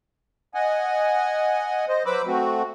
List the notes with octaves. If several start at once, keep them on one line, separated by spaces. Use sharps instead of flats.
D#5 F#5 G#5
C5 D#5
F#3 B4 C5 B5 D6 E6
A3 C4 F#4